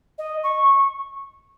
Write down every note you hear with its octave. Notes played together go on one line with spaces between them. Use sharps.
D#5
C#6